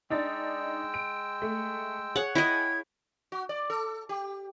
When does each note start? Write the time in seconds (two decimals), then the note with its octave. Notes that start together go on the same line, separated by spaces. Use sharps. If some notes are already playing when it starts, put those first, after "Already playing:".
0.10 G#3 D4 D#4 G5 E6 A6
0.94 D7
1.42 A3
2.16 G#4 C#5 F#5
2.35 E4 D#5 G5 G#6
3.32 F#4
3.49 D5
3.70 A4
4.09 G4